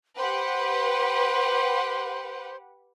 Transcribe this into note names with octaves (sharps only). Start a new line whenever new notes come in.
G4 B4 C5 F#5